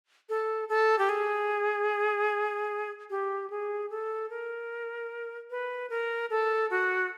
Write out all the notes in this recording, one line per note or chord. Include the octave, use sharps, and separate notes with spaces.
A4
A4
G4
G#4
G4
G#4
A4
A#4
B4
A#4
A4
F#4